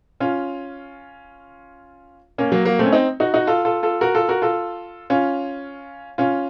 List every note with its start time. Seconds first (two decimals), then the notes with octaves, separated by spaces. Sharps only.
0.20 C#4 F4
2.38 A#3 C#4
2.52 F#3 A#3
2.65 F#3 A#3
2.79 A3 C4
2.86 C#4
2.92 C4 D#4
3.20 D#4 F#4
3.34 D#4 F#4
3.47 F4 A4
3.65 F4 A4
3.83 F4 A4
4.01 F#4 A#4
4.15 F4 A4
4.29 F#4 A#4
4.42 F4 A4
5.10 C#4 F4
6.18 C#4 F4